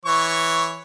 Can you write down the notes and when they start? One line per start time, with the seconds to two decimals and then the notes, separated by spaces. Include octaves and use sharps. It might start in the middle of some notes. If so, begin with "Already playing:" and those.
0.05 E3 C#5 C#6